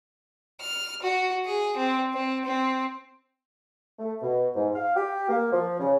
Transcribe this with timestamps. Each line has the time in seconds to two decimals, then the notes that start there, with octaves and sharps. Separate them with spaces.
0.60 F6
1.02 F#4
1.45 G#4
1.77 C4
2.14 C4
2.45 C4
3.99 A3
4.22 B2
4.55 G#2
4.74 F5
4.96 G4
5.29 A#3
5.51 F3
5.79 C#3